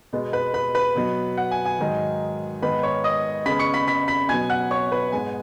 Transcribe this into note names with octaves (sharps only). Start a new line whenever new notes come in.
B2 G#3 B3
B4 B5
B4 B5
B4 B5
B2 F#3 B3
F#5
G#5
G#5
G#2 D#3 F#3
G#2 D#3 B3 B4 B5
C#5 C#6
D#5 D#6
C#3 G#3 B3 B5 B6
C#6 C#7
B5 B6
B5 B6
B5 B6
B2 F#3 B3 G#5 G#6
F#5 F#6
C#5 C#6
B4 B5
G#2 G#3 B3 G#5